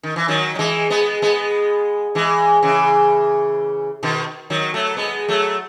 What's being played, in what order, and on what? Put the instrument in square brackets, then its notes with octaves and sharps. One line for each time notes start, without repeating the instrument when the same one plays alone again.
[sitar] D#3
E3
D#3 F#3
F#3
E3 G#3
G#3 B3
G#3 B3
E3 G#3
C#3 E3
B2 D#3
D#3 F#3
F#3 A3
G#3 B3
F#3 A3